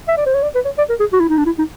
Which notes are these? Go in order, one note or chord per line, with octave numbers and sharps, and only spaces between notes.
E5
D5
C5
C#5
D5
B4
C#5
D5
A#4
G#4
F#4
E4
D#4
D4
E4
D#4